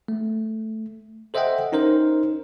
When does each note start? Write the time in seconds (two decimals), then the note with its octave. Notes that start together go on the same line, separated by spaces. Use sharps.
0.08 A3
1.34 A4 C5 D#5 E5 F#5 G5
1.72 C#4 D#4 A#4 C5